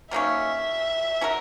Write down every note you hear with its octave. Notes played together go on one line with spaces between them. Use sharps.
D#3 F#3 A#3 C#4 E5
C#4 F#4 A#4